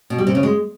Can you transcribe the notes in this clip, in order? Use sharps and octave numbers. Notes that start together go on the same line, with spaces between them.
B2
G3
C3
C#3
G#3